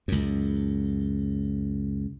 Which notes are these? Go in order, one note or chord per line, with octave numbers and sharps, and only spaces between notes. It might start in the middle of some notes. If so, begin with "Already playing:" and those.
C#2 F#2